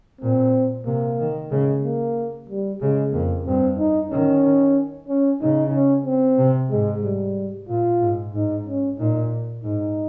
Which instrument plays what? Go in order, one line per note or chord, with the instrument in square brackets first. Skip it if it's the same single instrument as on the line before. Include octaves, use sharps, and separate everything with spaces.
[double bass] A#2 [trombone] C4
[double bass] C3 [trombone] A#3
[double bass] D#3
[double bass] C#3 [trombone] G#3
[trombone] A#3
G3
[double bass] C#3 [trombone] G#3
[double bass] F2 [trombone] A#3
[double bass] G2 [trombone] C4
[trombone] D#4
[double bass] D#3 [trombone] C#4
[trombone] C#4
[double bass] C#3 [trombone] D#4
[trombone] C#4
C4
[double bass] C3
[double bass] G#2 [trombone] G#3
[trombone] G3
[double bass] A#2 [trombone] F4
[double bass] G#2
[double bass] G#2 [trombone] D#4
[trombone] C#4
[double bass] A#2 [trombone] D#4
[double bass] G#2 [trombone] D#4